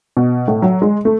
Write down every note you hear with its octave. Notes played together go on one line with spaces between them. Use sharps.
B2
A2
F#3
G#3
A3